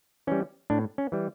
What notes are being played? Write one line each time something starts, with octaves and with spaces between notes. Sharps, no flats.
E3 G3 C#4
A2 D4
C#4
E3 G3